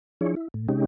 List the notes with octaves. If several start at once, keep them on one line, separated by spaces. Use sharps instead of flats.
F3 D4 E4 G#4 C#5
E4
A2
C3 G#3 C#4 D#4 G4